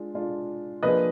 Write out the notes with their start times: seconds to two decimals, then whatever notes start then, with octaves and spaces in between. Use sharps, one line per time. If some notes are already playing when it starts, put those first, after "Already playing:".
Already playing: G#3 D4 F4
0.14 G#3 D4 F4
0.83 F3 A#3 D4 F4 G#4 B4 D#5